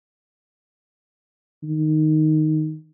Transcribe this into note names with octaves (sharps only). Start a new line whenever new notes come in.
D#3